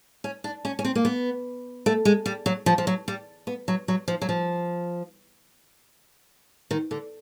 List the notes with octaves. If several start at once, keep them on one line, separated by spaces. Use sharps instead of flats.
C#4
D4
C#4
C#4
C4
A#3
B3
A3
G#3
G3
F#3
F3
F3
F#3
G3
B3
F#3
F#3
F3
F#3
F3
D#3
D3